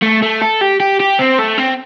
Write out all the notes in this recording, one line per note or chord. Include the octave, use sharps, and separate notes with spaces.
A3
A3
A4
G4
G4
G4
C4
A3
C4